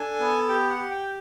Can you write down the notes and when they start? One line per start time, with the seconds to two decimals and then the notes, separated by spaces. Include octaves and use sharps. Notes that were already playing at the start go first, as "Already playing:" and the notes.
Already playing: D4 A4 G#5
0.20 B3
0.49 G4 G5
0.69 F#5
0.77 G4
0.91 G5